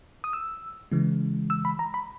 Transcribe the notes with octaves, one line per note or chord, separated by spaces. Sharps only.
D#6
E6
C#3 E3 G#3
E6
B5
A#5
B5